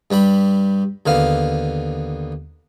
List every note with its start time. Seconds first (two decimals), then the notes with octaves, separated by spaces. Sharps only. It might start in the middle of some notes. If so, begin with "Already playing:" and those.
0.11 G2 G3 G5 B5
1.06 D#2 D3 B3 F5